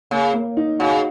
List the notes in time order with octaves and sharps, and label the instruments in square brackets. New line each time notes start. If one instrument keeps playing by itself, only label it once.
[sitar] C#3 [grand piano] A#3
[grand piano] A#3
D#4
[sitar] C#3 [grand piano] F#4